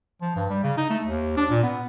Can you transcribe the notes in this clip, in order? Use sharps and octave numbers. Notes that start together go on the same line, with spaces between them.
F3
G2
G3
C#3
D#4
A3
D#2
D4
A#2
B3